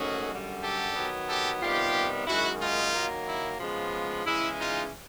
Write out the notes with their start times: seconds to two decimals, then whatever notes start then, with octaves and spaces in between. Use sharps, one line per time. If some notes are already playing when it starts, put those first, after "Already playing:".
Already playing: G#2 D#3 F#3 A3 C#4 F#4 G#4
0.30 F#2 D3 G3
0.62 G4 A4
0.96 D#3 F#3 B3
1.29 G4 A4
1.62 C3 D#3 G3 B3 F4 G4
2.27 F#2 D#3 G#3 E4 F#4
2.61 D#4 F4
2.94 D#3 F#3 A#3
3.27 E4
3.59 C#3 F3 G#3 B3
4.25 C#3 E3 G#3 C#4 E4
4.59 D#4 F4